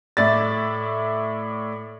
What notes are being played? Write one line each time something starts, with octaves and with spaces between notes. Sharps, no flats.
A2 D5 E5 A6